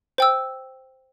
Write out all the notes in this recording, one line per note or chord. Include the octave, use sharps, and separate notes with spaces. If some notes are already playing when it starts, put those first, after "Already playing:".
C5 G5 E6